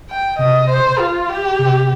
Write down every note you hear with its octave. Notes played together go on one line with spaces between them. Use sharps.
G5
C3 D#5
C5
F4
G4
C3